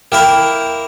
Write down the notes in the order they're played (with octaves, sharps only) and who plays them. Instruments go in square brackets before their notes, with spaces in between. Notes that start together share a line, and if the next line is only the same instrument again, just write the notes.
[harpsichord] A#3 E4 A#4 [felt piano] G5